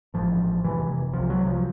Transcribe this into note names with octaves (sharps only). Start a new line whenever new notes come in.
A1 G#2 F3
F1 E2 C3 E3
C2 C3 F3
F#3
F3